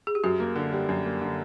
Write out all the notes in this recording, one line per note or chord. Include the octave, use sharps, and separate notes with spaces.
G#4
G4
F#2 F#4
A#3
D3
G3
F#2
A#3
D3